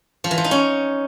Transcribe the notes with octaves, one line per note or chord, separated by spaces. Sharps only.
F3
E3
F3
D#4
C#4